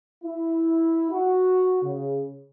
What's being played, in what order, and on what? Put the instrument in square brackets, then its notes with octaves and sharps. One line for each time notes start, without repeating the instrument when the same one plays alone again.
[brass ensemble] E4
F#4
C#3